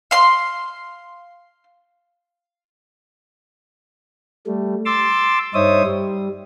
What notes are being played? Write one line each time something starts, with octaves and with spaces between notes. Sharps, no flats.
F5 C6
G3 A3
C6 D6 E6 A6
G2 D#4 C5 C#5 E5 D#6
G3